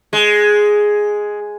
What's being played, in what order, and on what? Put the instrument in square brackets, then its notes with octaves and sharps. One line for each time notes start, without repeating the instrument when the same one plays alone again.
[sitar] G#3